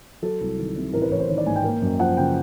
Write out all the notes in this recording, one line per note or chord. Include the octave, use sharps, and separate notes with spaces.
F#3 A4
C2
D#3
C3
A1 A#4
B4
A1 C#5
C5
D#3 C#5
D5
G#2 G#5
G5
A#3
F#2
F3 F#5
C#3 G5